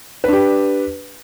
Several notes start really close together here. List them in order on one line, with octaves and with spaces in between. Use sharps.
B4 D4 G4